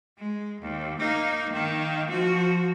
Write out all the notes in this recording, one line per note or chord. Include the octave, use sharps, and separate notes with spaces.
G#3
D#2
A#3 D#4
D#3 A#3
F3 F#4